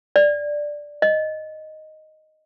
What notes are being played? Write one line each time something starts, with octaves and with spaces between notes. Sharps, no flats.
D5
D#5